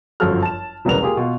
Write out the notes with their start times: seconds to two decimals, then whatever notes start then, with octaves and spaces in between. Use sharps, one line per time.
0.20 G1 F#2 F3 F#4 A4 F6
0.42 A5 E7
0.85 E1 C2 C#3 A#4 B4 F7
1.01 A#3 F4 G4 G#4
1.17 B2 F4